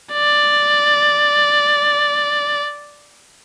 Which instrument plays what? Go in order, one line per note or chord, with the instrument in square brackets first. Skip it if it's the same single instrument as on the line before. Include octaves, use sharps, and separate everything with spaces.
[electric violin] D5